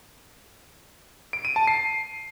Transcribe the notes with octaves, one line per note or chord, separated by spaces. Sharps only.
D7
D#7
A5
C7